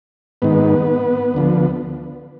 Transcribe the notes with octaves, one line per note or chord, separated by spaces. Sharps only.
G#2 D#3 B3
D2 D3 F3